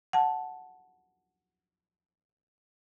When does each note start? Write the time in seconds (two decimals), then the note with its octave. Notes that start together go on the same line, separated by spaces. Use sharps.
0.13 F#5 A5